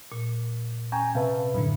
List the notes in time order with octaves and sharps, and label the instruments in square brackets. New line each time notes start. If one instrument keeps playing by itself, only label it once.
[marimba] A#2
[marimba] C#4 [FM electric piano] G5 [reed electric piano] G#5 A#5
[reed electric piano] C3 B4 E5 [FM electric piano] F5 A5
[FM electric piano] F#2 A2 D3 [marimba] B5